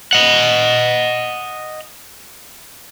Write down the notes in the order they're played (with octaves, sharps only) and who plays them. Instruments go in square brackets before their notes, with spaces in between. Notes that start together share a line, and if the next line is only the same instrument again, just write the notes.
[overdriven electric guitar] D#5 F#5